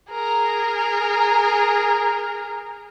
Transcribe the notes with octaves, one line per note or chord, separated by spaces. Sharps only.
G#4 A#4